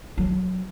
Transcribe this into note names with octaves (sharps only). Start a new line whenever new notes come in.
F#3